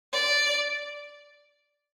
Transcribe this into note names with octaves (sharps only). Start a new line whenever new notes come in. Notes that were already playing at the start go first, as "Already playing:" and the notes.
D5